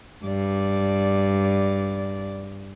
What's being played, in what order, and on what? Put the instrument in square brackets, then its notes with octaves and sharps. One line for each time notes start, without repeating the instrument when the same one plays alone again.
[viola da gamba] G2 D5